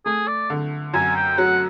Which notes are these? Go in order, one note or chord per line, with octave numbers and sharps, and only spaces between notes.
A3 G#4
D5
D3
F#2 G#5
G5
F#3 F#5